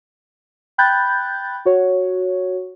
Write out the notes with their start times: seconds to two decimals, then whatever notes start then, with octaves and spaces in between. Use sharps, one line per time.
0.78 G5 B5 F#6 G6 A6
1.65 F#4 C#5